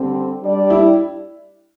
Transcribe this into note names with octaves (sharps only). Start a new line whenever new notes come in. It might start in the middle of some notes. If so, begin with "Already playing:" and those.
Already playing: D3 G3 C4
G3 D4 G4 D5
E4